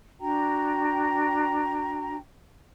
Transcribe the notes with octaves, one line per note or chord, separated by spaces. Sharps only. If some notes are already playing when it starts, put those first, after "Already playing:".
D4 F#4 G5 A#5